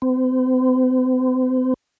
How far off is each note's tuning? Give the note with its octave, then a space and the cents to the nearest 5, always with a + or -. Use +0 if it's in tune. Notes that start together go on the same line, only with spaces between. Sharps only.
C4 -40